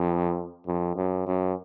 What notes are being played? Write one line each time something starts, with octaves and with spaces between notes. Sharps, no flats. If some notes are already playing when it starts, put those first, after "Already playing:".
Already playing: F2
F2
F#2
F#2